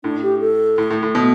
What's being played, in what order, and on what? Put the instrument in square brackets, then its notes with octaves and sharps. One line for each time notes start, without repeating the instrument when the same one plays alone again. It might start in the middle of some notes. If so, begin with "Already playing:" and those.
[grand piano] A2 [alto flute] D4
[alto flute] G4
A4
[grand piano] A2
A2
A2
B2